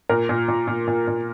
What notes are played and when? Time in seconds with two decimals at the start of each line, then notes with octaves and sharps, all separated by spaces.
0.09 A#2 A#4
0.29 A#2
0.48 A#2
0.67 A#2
0.88 A#2
1.08 A#2